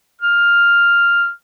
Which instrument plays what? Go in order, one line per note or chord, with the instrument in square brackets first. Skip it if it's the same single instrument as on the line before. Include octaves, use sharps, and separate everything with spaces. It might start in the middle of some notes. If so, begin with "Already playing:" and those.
[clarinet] F6